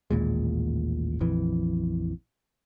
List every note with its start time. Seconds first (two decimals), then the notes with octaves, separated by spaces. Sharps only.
0.11 A1 D#2 A#2 G#3
1.20 A#1 F2 E3